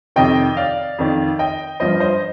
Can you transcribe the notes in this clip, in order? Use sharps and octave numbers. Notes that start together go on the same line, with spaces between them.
F2 C3 D#3 D#5 G5
D5 F5
F2 D#3
D#5 G5
G2 F3 C5 D#5
C5 D#5